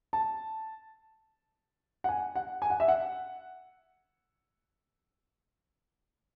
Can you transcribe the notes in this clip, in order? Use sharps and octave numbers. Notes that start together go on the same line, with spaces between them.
A5
F#5
G#5
F#5
G#5
F#5
E5
F#5